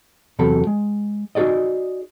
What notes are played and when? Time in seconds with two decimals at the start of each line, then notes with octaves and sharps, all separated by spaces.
0.39 E2 C3 F#3 A4 B5
0.67 G#3
1.35 D#4 F#4 G#4 D5 D#5